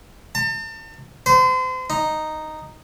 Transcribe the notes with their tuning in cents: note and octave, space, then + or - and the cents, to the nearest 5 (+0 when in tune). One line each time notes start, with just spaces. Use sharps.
A5 +40
C5 -35
D#4 -5